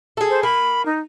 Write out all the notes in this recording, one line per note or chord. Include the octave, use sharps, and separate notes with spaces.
G#4 A4
C5
A#3 B5
D#4